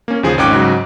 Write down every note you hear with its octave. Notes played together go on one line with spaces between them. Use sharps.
A#3 C#4
D#2 C#3 F3 G#4
G#1 C#4 D#4 G5 D6 F#6
G#2 C#3 F#3